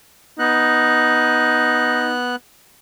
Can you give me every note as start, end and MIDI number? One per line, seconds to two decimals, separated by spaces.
0.39 2.36 59
0.39 2.15 63
0.39 2.36 90